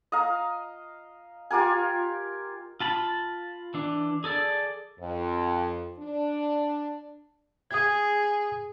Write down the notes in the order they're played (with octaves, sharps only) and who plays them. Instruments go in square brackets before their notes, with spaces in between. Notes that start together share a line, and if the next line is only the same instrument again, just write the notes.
[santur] D#5 F5 A#5
F4 G4 A#4 G#5
[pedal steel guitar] F4 A5 B5
E3 D4
G#4 A4 D5
[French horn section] F2
D4
[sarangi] G#4 [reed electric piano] D#6 G#6